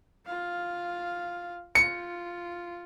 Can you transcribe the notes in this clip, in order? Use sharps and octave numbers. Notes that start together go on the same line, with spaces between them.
F4 F5
F4 C#7